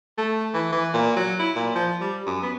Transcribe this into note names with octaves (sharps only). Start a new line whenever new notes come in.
A3
E3
E3
A#2
F#3
E4
A#2
F3
G3
F#2
B3